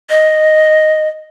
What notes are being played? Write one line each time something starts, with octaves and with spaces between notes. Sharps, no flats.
D#5